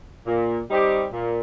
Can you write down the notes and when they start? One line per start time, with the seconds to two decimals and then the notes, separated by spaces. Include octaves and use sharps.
0.27 A#2
0.69 G3 C4 D#4 G4
1.12 A#2